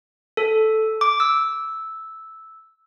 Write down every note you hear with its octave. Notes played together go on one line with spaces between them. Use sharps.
A4
D6
E6